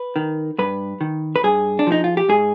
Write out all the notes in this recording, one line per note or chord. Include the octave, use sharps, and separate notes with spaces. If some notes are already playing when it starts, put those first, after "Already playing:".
Already playing: B4
D#3
G2 B4
D#3
B4
G2 G#4
D4
F3 D#4
F4
G4
G#2 G#4